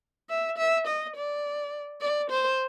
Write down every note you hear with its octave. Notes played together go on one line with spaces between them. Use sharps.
E5
E5
D#5
D5
D5
C5